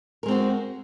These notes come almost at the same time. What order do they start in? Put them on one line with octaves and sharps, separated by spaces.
A#4 G#3 C4 F#4